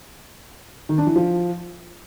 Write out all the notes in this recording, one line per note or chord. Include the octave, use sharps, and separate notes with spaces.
D#3
D4
E3
F3